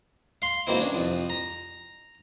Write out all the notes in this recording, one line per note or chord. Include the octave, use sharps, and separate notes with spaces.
F5 C6
G#2 B2 A#3 C4 E4
C#4 D4
C2 F2
A#5